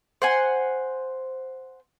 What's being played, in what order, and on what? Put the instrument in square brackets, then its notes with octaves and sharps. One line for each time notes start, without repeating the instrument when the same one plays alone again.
[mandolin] C5 F#5 G#5